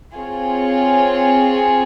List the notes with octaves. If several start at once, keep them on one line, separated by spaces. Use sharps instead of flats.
C4 F4 G#4 C#5